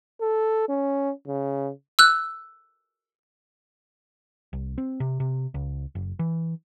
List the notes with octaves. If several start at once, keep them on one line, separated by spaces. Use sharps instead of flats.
A4
C#4
C#3
E6 F#6
C2
C4
C3
C3
C#2
F#1
E3